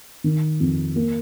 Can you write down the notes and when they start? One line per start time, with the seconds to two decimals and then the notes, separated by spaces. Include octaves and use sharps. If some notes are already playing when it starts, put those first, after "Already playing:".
0.24 D#3
0.60 F2
0.96 A#3